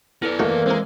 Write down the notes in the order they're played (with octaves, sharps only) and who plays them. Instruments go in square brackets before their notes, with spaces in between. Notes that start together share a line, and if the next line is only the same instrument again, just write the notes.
[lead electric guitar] B3 D5 [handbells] E4 A4 B4
[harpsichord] D#3 A3 F#4 [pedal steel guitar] E3 A#3
[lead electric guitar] G#3 [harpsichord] C4 A#4